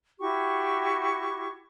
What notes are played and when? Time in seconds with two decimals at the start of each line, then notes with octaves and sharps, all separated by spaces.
0.20 E4 F#4 G4 C#6